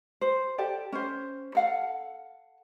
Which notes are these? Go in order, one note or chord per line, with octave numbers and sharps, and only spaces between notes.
C5
G4 A4 D5
C#4 C5
A4 F5 F#5